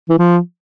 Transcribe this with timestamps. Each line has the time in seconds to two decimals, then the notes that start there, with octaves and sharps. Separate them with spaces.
0.09 E3
0.18 F3